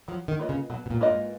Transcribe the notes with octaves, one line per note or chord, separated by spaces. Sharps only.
F3 F#3
D#3
A#3 F4 B4 D#5
C#3
B2 F#3
B2
A#2
A#3 F4 B4 D#5
G#2